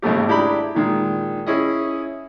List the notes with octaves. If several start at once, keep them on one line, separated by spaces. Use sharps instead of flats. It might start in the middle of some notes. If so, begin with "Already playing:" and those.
G#1 D#2 C#3 A3 G4
D4 E4 G4 G#4 A#5 B5
A#2 D#3 G#3
C#4 E4 G#4 D#5